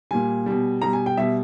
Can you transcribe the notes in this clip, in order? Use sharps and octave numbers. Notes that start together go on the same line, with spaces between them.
A#2 G3 G#5
B2 G3
B2 G3 A#5
G#5
G5
B2 G3 E5